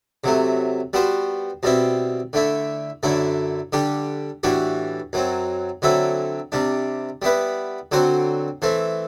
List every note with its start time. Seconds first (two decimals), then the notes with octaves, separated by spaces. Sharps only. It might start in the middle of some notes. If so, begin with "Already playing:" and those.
0.24 C3 F#3 A3
0.93 G3 B3 F#4 C5
1.63 B2 G3 C4 E4
2.33 D3 A3 E4
3.03 F#2 D3 A3 E4
3.73 D3 G3 D4 G4
4.43 A2 E3 G3 D4 F#4
5.13 F#2 F#3 C4
5.82 D3 F#3 C4 E4 A4
6.52 C3 G3 D4
7.22 G3 B3 E4 B4
7.92 D3 F#3 C4 F#4 C5
8.62 E3 A3 C4